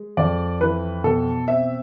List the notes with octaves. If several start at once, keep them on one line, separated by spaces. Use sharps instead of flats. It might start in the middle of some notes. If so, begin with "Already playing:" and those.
Already playing: G#3
F2 D5
E3 B4
B2 A4
C4 E5